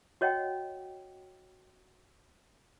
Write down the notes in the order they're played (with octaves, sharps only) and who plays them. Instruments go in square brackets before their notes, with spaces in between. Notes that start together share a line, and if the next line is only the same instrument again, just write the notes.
[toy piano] F#4 C#5 D#5 F#5 G5